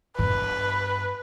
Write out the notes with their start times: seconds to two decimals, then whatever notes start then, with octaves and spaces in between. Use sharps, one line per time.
0.19 G2 B3 B4